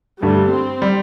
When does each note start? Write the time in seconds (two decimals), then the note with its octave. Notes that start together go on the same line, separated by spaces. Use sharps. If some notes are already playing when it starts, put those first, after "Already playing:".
0.22 G2 D3 G3 A3
0.52 C4
0.82 G3